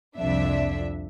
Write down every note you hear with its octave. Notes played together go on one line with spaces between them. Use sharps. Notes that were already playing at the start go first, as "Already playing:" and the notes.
C2 F2 D4 E5